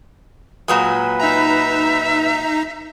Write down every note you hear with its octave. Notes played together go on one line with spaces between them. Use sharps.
A#2 F#3 G#3 B4
D#4 E5 A#5